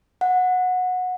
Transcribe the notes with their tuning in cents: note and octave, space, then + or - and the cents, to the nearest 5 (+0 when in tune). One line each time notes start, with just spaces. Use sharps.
F#5 -15